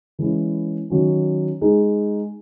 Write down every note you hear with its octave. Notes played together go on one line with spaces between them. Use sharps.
E3 G#3 C#4 E4
D#3 F#3 C#4
G#3 D#4 G#4